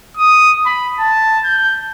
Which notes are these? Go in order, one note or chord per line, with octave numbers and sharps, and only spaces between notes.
D#6
B5
A5
G6